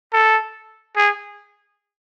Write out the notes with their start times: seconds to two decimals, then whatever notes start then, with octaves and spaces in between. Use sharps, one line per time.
0.13 A4
0.97 G#4